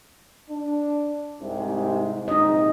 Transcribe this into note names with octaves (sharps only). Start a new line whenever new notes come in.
D4
C2 G#2 C3
A#1 C3 G#3 D#4 D#5